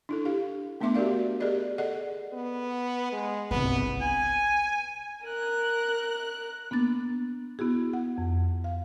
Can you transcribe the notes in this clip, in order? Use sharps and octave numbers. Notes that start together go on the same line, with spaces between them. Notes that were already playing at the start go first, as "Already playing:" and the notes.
D4 E4 A4
G4 F5
A3 B3 D4 E5 C6 D6
F#4 G4 A#4 D5 F5
G4 G#4 A#4 D5 D#5
G#4 A4 D5 D#5 F#5
B3
G#3
G1 C2 B3
G#5
A#4 F#6
A#3 B3 D4 A6
B3 E4 F#4 G#4
F#5
F2
F5